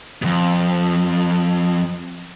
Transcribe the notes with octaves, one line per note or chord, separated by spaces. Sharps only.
F2 G#2